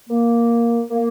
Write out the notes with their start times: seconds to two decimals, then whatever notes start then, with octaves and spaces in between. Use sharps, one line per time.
0.09 A#3
0.91 A#3